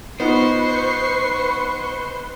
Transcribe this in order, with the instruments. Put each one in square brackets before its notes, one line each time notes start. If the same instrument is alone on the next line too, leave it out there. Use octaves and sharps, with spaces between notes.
[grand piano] B3 D#4 F4 [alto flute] B4 [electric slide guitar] C5 [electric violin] C#6 C7